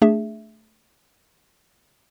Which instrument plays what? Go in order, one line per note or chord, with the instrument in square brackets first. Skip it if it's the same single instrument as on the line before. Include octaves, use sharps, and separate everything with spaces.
[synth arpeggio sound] A3 D4 G#4 E5